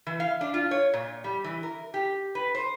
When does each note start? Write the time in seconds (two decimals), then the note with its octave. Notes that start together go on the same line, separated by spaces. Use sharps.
0.07 E3
0.20 F5
0.41 D4
0.54 F4
0.71 C#5
0.94 A#2
1.24 G3
1.44 E3
1.63 A#4
1.94 G4
2.35 B4
2.55 C5